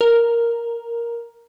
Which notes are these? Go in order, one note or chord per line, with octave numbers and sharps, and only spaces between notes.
A#4